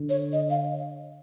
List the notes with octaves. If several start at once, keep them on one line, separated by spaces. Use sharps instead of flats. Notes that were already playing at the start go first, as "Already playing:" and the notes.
Already playing: D3
C#5
D#5
F5